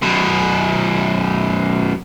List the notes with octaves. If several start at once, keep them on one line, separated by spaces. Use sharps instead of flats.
F#2 B2